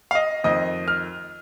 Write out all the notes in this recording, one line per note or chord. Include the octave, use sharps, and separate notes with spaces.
F5
D#5
F2 D#3 C4 D#5
F6